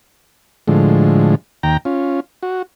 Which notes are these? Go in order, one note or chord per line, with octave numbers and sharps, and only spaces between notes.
A2 D3 F3 G#3
D#2 G5 A#5
C#4 F4
F#4